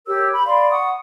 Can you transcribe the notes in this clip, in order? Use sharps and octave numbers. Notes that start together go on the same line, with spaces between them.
G4 A#4 C#5 E6
B5
D5 F5 B5 C6
F#5 C#6 D#6